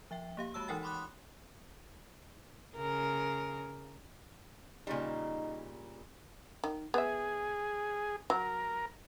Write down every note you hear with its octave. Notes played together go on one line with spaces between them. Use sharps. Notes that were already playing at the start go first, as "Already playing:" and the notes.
F3 E5 G5
A#3 G4 F5
G#3 F#4 C#5 A5 E6
E3 D#4 A#4 F#5 G5 A6
B5 C6 D6 D#6 F#6
C#3 A#4
A#2 C#3 G3 D#4
D#3
B3 G#4 E5
F#3 A#4